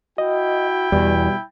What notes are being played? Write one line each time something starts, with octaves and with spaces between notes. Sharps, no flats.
E4 F#4 D#5 G5
E2 B2 E3 G3